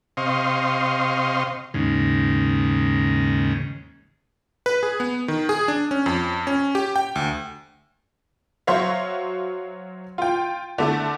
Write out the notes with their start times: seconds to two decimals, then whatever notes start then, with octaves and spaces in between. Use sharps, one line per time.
0.17 C3 D#5 F5 C6 C#6
1.74 D#2 G#2 C#3
4.66 B4
4.83 G#4
5.00 B3
5.28 D#3
5.49 G#4
5.68 D4
5.91 C#4
6.06 F2
6.47 C#4
6.75 G4
6.96 G5
7.16 D2
8.67 F#3 F#4 C5 C#5 E5 F5
10.18 F4 G5
10.78 D3 A3